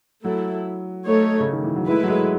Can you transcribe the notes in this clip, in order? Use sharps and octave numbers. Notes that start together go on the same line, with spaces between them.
F#3 A3 E4 A4
A3 D#4 A4 C#5
C#3
D#3
E3
F#3
G#3 A3 E4 B4
F#3
G#3